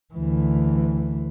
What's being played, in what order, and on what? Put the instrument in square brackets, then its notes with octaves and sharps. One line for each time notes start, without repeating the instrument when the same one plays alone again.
[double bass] D2 E3